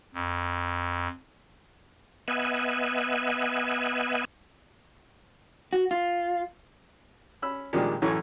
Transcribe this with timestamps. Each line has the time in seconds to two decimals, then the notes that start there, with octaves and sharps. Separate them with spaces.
0.14 F2
2.28 B3 D#5 E5 F#5 G#5
5.73 F#4
5.91 F4
7.42 C#4 B5 E6
7.73 A#2 D#3 F3 G3 G#3 D4
8.02 A1 F#2 E3 A4 C#5 G#5